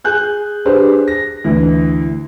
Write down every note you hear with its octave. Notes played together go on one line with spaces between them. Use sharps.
G#4 G#5 F#6 G6
D4 G4 G#4 B4 C5
A#6
D2 E3